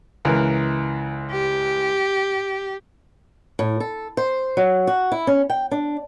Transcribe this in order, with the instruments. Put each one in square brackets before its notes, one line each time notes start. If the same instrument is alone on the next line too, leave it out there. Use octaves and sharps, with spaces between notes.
[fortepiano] C#2 E3 A#4
[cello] G4
[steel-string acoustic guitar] A2
A4
C5
F#3
F#4
E4
C#4
G5
D4